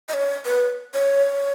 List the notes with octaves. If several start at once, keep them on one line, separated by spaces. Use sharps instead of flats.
D#5
C#5
B4
C#5